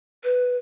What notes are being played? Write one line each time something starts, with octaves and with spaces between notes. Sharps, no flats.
B4